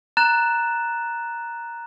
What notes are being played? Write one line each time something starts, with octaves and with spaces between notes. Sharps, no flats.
A#5 F#6 A6 E7